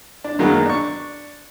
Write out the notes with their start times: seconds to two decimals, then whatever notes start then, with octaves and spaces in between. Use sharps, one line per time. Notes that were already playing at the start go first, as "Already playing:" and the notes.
0.24 D4
0.39 F#2 D#3 F#3 G#3 A#3 B3
0.66 D4 C#6